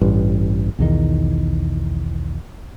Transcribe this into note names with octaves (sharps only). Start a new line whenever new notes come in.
A1 G2
B1 E2 D#3